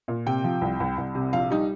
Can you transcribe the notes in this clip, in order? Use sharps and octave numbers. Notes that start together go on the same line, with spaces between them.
A#2
C3 G5
F3
C2
C2
C2
C3
A#1 F5
G3 D#4